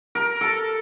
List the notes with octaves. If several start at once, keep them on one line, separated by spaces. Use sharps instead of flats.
A#4
A4